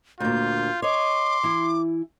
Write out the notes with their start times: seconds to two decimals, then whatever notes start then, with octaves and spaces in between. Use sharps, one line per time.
0.20 D2 A#2 F4 G6
0.82 C#5 D#5 C6 D6
1.43 E3 E4